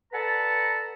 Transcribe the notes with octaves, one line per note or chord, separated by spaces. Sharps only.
A4 B4 D5 F#5 A5 A#5